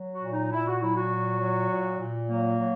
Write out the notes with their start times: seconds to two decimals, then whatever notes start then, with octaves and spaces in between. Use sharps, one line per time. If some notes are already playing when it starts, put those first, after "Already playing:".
Already playing: F#3
0.12 F#4
0.22 A#2
0.33 D#4
0.52 A#2 E4
0.67 F#4
0.81 F#3 E4
0.96 F#4
1.11 A#2
1.40 F#3
1.69 A#2
2.00 A#2
2.28 F#3 A#3
2.58 F#3